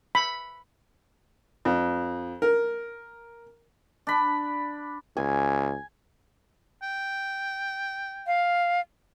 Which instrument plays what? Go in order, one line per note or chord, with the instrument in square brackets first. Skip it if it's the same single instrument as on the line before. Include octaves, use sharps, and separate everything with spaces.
[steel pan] B5
[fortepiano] F2
A#4
[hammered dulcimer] D4 B5
[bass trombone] C#2 [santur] G#5
[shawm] G5
[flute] F5